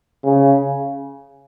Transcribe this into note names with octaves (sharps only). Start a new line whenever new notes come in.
C#3